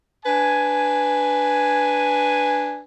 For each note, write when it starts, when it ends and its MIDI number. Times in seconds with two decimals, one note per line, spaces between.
0.26 2.81 62
0.26 2.81 71
0.26 2.81 80